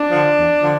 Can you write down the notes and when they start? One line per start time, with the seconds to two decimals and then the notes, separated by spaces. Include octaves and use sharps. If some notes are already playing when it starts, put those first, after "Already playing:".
Already playing: D4
0.10 D3 F3
0.37 E2
0.61 D3 F3